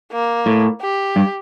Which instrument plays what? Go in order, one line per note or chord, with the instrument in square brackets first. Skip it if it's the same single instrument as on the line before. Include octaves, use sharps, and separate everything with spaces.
[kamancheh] A#3
[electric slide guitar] A2
[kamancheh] G4
[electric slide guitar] G2